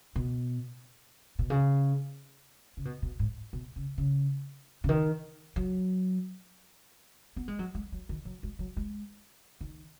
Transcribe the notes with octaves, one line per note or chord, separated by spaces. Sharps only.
B2
B2
C#3
C#3
B2
B2
G#2
B2
C#3
C#3
C#3
D#3
F#3
B3
G#3
F#3
G#3
F#3
D#3
F#3
G#3
F#3
G#3
D#3